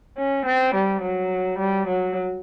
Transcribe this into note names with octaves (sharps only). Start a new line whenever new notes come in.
C#4
C4
G3
F#3
G3
F#3